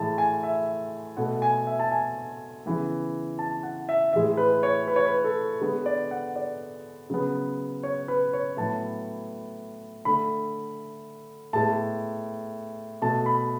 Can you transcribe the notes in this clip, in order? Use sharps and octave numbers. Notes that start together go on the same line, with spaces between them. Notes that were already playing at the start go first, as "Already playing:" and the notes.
Already playing: A2 E3 G#3 A5
G#5
E5
B2 A3 F#5
G#5
E5
A5
G#5
C#3 E3 B3
A5
F#5
E5
A2 E3 G#3 E5
B4
C#5
B4
C#5
B4
A4
D3 G#3 B3
D5
F#5
D5
C#3 F#3 B3
C#5
B4
C#5
A2 F#3 B3 A5
D3 A3 B5
A2 G#3 B3 A5
B2 A3 A5
B5